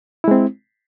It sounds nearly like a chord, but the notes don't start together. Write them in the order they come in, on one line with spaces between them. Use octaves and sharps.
E4 G#3 C4